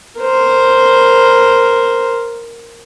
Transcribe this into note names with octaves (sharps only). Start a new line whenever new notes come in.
A#4 C5